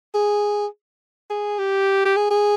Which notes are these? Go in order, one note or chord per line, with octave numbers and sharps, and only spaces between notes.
G#4
G#4
G4
G4
G#4
G#4